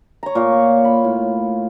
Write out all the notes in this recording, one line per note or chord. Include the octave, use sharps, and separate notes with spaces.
C#5 A#5
A#2 F5
C#6
B5
A2